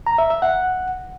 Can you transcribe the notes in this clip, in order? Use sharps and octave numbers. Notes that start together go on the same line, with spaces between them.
A#5
E5
E5
F#5